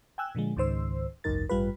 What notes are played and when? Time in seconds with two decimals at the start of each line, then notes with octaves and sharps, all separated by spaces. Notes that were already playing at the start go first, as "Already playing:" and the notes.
0.18 G5 G#5 E6 F#6
0.35 A#2 D3 F3 G#3
0.56 C#2 G#2 D#3 C5 E6
1.24 G#1 C#2 F#2 D#4 A#4 A6
1.49 A1 G2 G3 F4 B4